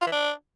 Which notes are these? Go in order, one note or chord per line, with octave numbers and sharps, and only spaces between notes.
F4
E3
D4